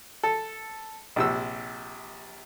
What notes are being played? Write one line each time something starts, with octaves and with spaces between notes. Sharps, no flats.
A4
A#1 C3 E6